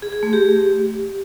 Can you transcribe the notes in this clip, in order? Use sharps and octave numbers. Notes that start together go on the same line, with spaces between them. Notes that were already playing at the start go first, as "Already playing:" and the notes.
G#4
G#4
A3
G4